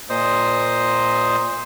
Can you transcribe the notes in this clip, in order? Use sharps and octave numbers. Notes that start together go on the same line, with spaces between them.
A#2 C5 D#5